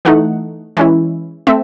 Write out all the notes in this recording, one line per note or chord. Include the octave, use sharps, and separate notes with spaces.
E3 A3 D#4 F#5
E3 G#3 C#4 E4
A3 C4 E5